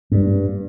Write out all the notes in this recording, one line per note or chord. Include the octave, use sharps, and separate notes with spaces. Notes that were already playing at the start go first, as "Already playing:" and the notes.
G2